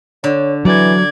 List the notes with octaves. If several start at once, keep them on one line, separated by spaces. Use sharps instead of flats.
D3 C#5
E3 F#3 D5 G#6